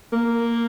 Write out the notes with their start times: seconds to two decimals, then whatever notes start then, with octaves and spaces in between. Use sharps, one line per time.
0.13 A#3